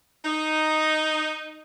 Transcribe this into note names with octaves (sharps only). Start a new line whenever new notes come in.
D#4